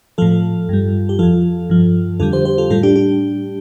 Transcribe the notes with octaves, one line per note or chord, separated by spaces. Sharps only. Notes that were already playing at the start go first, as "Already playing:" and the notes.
A2 F3 F4 A4
G2 G3
G4
F2 F3 F4 A4
G2 F3
F2 D3 G3 F4 A4
G4 C5
G4 C5
F4 A4
A2 G3 F4 A4
D4 G4
D4 G4